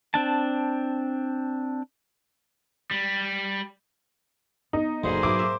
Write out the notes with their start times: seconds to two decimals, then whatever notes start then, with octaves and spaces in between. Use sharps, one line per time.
0.14 C4 D4 A5
2.91 G3
4.73 B3 D#4
5.04 F#1 B1 A#2 D3 A#3 G#4 C5
5.23 B1 G#2 E4 D6
5.39 E5